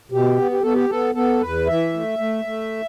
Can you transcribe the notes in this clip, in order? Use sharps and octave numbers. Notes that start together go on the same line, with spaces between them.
B2 G4
B3
G4
B3 A4
G4
B3 A4
B3 A4
E2 B4
E3 E5
A3
A3
A3